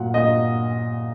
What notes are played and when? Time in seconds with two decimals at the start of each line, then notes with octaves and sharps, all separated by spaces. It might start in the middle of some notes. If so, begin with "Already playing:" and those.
Already playing: A#2 F#3 F#5
0.14 A#2 D#5